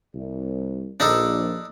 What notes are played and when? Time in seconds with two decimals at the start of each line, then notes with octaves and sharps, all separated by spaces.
0.14 C2
1.00 A#1 D4 D#4 A4